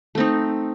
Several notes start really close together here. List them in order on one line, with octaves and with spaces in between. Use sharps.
A3 C4 D#4